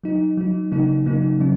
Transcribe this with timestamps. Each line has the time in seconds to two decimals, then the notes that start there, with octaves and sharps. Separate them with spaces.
0.04 F#3 D#4
0.37 F#3 D#4
0.71 C#3 F#3 A#3 D#4
1.06 C#3 F#3 A#3 D#4
1.40 C#3 F#3 C#4